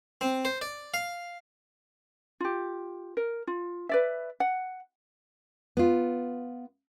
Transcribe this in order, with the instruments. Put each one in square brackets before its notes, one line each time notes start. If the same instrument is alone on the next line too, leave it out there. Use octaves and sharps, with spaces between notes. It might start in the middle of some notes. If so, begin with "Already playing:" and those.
[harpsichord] C4
C5
D5
F5
[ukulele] F4 G4
A#4
F4
B4 D5 E5
F#5
[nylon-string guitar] B3 F4